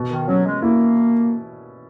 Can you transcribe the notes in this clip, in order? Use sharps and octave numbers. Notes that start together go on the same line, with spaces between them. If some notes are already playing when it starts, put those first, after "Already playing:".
Already playing: B2
D#3
F#3 C#4
G#3
A#3 E4